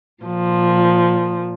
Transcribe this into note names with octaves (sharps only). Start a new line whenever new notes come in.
A#2 F3